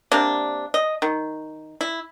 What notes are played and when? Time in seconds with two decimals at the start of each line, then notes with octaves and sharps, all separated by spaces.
0.11 C3 A#3 D4
0.74 D#5
1.02 D#3
1.81 E4